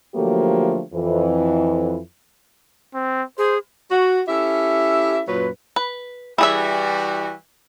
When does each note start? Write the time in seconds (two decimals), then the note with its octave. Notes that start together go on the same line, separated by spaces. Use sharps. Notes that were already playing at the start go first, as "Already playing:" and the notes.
0.14 D3 F3 F#3 A3 A#3 G4
0.93 F2 E3
2.95 C4
3.38 G#4 C5
3.90 F#4
4.28 C#4 E4 G4 A4 E5
5.28 F#2 A#2 F#3 B4
5.76 B4
6.38 E3 G3 E4 F#4 G#4 E5